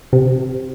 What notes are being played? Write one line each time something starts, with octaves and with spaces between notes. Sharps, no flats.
C3